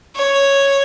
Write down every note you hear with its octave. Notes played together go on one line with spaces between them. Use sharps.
C#5